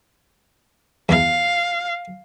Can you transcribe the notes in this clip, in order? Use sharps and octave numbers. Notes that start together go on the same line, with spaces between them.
E2 E3 F5